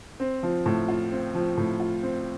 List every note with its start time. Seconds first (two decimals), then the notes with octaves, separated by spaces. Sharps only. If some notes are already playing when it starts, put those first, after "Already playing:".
0.20 C4
0.43 F3
0.66 A2
0.88 F4
1.12 C4
1.35 F3
1.57 A2
1.80 F4
2.03 C4